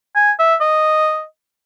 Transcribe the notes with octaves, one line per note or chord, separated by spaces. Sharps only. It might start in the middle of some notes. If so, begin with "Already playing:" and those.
G#5
E5
D#5